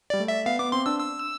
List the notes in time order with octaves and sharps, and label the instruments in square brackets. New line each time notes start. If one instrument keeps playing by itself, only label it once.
[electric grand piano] G3 [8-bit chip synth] D5
[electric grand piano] A3
[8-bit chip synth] E5
[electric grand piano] B3 [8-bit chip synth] F5
[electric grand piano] B3 [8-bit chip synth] D6
[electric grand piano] C4 [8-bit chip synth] C6
[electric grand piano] D4 [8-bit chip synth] E6
[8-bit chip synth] E6